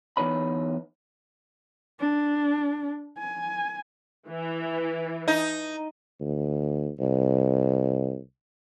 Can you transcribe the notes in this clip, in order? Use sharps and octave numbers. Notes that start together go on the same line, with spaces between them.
E2 D#4 B4 C#5 B5
D4
G#5
E3
D#4
D2
C2